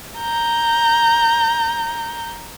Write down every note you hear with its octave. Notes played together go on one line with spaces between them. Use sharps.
A#5 G6